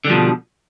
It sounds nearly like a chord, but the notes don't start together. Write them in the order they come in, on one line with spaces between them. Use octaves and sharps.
D3 G3 F3 B2